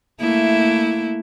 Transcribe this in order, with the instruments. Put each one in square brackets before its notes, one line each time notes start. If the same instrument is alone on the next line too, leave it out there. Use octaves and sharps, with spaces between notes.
[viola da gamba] A3 A#3 E4